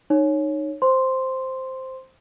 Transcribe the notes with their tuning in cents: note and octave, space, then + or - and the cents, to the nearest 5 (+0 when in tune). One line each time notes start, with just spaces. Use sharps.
D#4 -20 C#5 -5
C5 +0 C6 +0